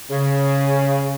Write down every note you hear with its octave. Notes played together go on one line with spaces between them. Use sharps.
C#3